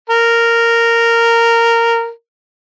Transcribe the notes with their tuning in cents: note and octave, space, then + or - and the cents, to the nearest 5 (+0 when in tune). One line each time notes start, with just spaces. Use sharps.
A#4 -10